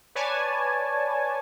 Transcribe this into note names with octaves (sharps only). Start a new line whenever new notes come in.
B4 C#5 D5 G#5 A5